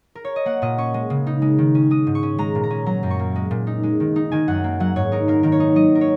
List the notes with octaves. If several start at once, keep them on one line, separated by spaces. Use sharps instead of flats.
A#4
C#5
D#5
A#3 F#5
A#2 D#5
C#4 C#6
G#3
C#3
D#4
G#3
D#3
C#4
G#3 D#6
G#2
C#6
C#4
G#3 A#5
A#2
A#5
C#4
F#3 A#5
F#2
C#6
A#3
G#3
A#2
D#4
G#3
D#3
D#4
D#3 G#5
F#2 F#5
A#3
F#3 F#5
G#2 C#5
D#4 A#4
A#3 A#4
D#3 A#4
C#5
D#4
F#3 D#5
A#4
C#5